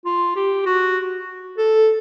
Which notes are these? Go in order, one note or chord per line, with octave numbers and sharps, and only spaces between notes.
F4
G4
F#4
A4